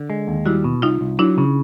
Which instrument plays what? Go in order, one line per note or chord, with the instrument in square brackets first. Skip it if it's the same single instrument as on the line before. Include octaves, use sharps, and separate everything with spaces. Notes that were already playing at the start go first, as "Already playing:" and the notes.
Already playing: [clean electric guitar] D3
G#3
D#2
[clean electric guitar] G3 [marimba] E4 F#4
[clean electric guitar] B2
[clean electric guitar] C2 [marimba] D#4 F4
[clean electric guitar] C2
[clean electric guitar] F#3 [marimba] D4 E4
[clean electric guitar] C#3